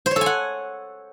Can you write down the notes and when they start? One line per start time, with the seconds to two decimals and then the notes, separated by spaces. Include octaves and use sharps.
0.06 C5
0.11 C#5
0.16 A4
0.21 G#5
0.26 F#5